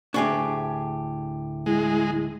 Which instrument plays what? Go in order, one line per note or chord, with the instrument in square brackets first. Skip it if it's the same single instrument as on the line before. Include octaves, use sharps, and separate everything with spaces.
[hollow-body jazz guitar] D2 A2 D4 [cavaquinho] G4 G#4 C#6
[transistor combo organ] G#3 [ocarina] E4